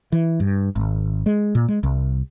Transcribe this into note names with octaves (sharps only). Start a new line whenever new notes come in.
E3
G2
G#1
G#3
A#2
G#3
C2